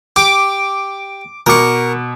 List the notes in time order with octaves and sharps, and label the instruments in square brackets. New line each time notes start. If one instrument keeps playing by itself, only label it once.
[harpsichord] G4 [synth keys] D6 [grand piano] D7
[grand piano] B2 D6 [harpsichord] A#4 C#6